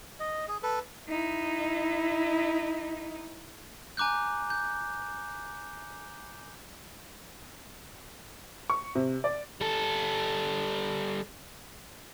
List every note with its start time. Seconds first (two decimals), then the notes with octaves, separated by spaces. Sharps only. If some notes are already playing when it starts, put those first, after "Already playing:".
0.20 D#5
0.48 G#4
0.63 A4 B4
1.09 D#4 E4
3.97 G#5 A#5 D6 F#6 G6
4.50 G6
8.70 C#6
8.95 C3
9.24 D5
9.61 G3 A4